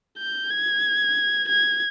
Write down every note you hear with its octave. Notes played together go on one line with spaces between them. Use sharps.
G6
G#6
G#6